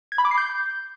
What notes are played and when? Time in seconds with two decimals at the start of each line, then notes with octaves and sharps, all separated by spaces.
0.12 G#6
0.18 B5
0.25 D6
0.31 C7
0.38 G6